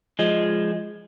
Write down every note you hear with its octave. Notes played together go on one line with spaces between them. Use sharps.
F3 G#3